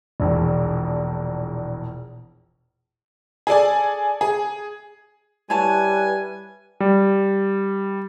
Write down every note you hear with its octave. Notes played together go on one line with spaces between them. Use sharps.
E1 A#1 E2
G#4 A4 D5 G#5
G#4
G3 E4 B4 C#5 G#5 A5
G3